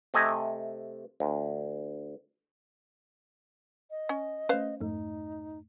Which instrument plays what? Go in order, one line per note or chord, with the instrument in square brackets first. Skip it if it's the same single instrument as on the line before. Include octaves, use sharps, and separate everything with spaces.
[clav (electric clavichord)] C3 A3 D#5 G#5
D2
[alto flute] D#5
[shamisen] C#4
[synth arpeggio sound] A3 C#4 [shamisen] B4 C5 F5
[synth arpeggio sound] F2 G#2 A3 [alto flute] D#4